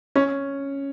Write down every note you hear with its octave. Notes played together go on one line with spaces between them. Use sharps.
C#4